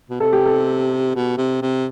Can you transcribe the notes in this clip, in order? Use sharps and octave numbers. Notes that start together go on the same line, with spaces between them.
B2
C3 A4
G4
A4
B2
C3
C3